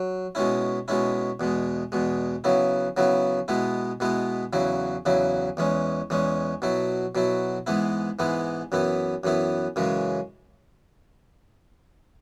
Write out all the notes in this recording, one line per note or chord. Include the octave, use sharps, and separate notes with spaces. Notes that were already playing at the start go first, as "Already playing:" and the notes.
Already playing: F#3
B2 G#3 C#4 E4
B2 G#3 C#4 E4
E2 B2 G#3
E2 B2 G#3
C#3 F#3 B3 E4
C#3 F#3 B3 E4
B2 G#3 B3 E4
B2 G#3 B3 E4
E2 C#3 F#3 E4
E2 C#3 F#3 E4
E2 E3 G#3 C#4
E2 E3 G#3 C#4
B2 F#3 E4
B2 F#3 E4
G#2 E3 G#3 B3 E4
G#2 E3 G#3 B3 E4
F#2 E3 B3 E4
F#2 E3 B3 E4
F#2 C#3 E3 G#3